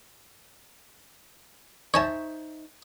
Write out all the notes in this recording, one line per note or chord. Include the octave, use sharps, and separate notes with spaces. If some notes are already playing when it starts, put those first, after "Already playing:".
D#4 C5 C#5 E5 G#5 A5